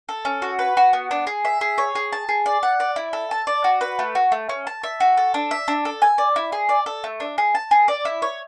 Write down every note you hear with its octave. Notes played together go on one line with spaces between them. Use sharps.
A4
C#4
F#4
B4
F#4
B3
D4
G#4
E5
G#4
C#5
G#4
A5
G#4
D5
F#5
D5
E4
A4
A5
D5
F#4
B4
A3
F#4
A3
C#4
A5
E5
F#4
A4
D4
E5
D4
A4
G#5
D5
E4
G#4
D5
A4
A3
D4
G#4
A5
G#4
D5
E4
C#5